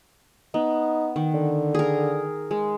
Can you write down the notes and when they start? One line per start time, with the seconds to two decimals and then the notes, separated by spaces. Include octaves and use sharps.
0.54 B3 D#4
1.16 D#3
1.34 D3
1.75 G#4 A#4
2.51 G#3